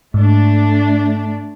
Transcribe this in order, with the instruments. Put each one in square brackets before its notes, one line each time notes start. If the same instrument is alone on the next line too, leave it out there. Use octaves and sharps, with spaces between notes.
[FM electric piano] G#2 [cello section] A3 D4